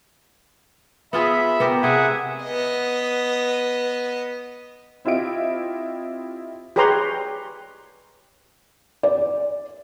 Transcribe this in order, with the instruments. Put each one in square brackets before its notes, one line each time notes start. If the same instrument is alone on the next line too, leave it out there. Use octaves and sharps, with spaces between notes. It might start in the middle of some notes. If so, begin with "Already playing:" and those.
[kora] B3 F4 G#4 [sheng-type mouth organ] E5 B5
[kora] B3 G4 A#4
[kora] C3 G#4 [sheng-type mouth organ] E5 F#5 G#5
[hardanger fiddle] B3 D#5
[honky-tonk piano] C4 E4 F4 G4 D#5 D7
[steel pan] G4 G#4 B4 C#5 A#5 C6
[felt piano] D5